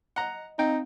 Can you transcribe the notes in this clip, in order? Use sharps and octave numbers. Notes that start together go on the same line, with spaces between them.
D#5 F#5 A#5
C4 D#4 F5 G5